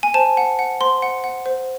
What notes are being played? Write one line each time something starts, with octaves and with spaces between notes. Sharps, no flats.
G#5
C5 A5
F#5
F#5
C5 C6
F#5
F#5
C5